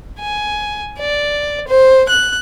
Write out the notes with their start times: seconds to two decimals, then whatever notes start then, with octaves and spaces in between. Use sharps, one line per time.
0.19 G#5
0.98 D5
1.67 C5
2.09 F#6